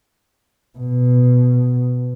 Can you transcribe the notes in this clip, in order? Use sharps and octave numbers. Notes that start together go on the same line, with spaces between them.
B2